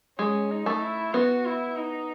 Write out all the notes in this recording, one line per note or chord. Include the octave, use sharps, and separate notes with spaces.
G#3 C#4
D#4
A3
E4
B3 F#4
E4
D#4